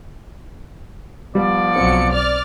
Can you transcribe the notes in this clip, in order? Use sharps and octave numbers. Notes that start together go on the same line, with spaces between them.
F3 G3 B3 D5
B1 F#3 C4 C#7
D5 F6